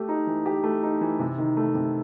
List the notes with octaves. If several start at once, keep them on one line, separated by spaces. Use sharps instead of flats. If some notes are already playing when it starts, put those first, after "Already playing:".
Already playing: A3 G4
D#4
E3
G4
A3
D#4
E3
C3
D#3
A3
C3